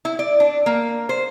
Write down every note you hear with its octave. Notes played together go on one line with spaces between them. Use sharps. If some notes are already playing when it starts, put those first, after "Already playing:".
E4
D5
D4
A#3
C5